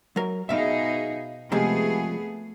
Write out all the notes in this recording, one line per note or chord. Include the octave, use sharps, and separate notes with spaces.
F#3 A#4
B2 D#4 G#4 E5 F5
C3 F3 G#3 A3 B3 G#4